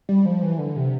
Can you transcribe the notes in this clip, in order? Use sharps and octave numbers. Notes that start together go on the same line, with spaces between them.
G3
F3
E3
D3
C3